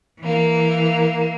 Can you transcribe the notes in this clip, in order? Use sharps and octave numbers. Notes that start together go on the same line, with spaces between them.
E3 A#3